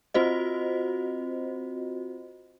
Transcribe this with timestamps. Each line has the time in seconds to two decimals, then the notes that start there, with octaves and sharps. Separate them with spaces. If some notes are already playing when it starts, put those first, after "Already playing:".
0.14 C4 F4 F#4 C5 D#5